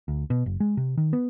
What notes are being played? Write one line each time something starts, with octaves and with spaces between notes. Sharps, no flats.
D2
B2
F#1
G#3
C3
D#3
B3